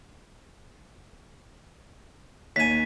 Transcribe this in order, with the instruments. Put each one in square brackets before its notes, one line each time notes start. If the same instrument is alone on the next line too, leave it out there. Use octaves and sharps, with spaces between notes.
[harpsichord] D#2 G#5 [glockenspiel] B6